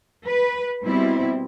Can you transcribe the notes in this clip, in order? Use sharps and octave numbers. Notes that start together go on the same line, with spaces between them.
B4
B2 G3 C4 E4